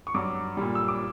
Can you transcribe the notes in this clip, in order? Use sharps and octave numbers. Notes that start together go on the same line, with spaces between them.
C#6
G2 F#3 D6
A#2 G3
E6
D6